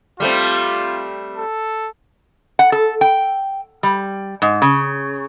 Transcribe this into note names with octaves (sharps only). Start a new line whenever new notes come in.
G3 A3 C4 F4
A4
F#5
A4
G5
G3
G#2
C#3